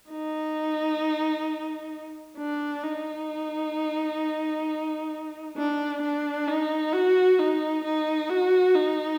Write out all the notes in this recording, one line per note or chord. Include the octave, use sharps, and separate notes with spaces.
D#4
D4
D#4
D4
D4
D#4
F#4
D#4
D#4
F#4
D#4